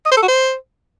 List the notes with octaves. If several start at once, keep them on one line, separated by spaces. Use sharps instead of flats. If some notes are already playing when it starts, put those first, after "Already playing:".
D#5
C5
A4
F#4
C5